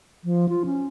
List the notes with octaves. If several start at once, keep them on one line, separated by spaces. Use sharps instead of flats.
F3
F4
C#4